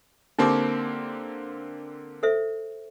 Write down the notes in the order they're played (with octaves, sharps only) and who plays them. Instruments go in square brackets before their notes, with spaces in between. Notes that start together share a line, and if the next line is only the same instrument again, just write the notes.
[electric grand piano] D3 A#3 C4 [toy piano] D#4 G4 D6
[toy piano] A4 C5 E5